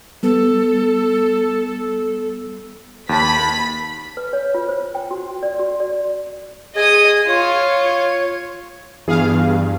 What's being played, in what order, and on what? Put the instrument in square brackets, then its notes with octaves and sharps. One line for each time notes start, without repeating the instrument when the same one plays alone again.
[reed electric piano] G3 B3 [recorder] A4
[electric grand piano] D#2 A5 [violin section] B5 B6
[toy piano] B4
C#5
F4
C5
G5
F#4
D5
F#4
D5
[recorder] G#4 [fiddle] D#5 D#6
[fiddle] F4 [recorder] C#5
[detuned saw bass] G2 [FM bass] E3 [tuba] B3 [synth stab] G#4 F5